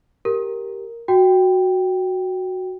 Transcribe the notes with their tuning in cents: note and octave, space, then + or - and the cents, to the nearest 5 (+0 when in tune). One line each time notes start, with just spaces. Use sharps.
G4 +0 A#4 +0
F#4 +0 G5 +0